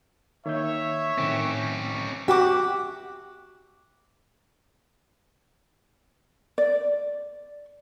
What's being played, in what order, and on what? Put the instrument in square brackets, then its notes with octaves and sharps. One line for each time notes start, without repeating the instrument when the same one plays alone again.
[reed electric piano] D#3 A#3 G6 [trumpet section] C#5 E5
[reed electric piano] A2 D#3 C4 [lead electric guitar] C#4 G4
[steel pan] F#4 G4 [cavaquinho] E5 F#5 D6
[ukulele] D5